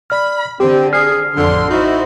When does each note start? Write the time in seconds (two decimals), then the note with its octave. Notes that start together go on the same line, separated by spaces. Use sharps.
0.10 D5 B5 F6
0.60 D3 C4 G4
0.93 G#4 F6 C7
1.36 A1 F2 D3 C6
1.71 D#4 E4 F#4 C5